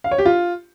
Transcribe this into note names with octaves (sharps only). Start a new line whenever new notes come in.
F5
C#5
G4
F4